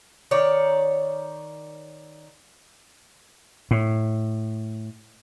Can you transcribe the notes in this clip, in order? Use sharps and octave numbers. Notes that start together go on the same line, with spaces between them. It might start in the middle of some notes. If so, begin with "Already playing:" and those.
D#3 C#5 D5
A2